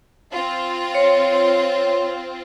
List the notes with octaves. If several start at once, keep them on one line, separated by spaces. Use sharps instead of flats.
C4 F4
C#5